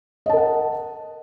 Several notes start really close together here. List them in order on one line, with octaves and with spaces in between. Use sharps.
D#5 A5 A#4 F#5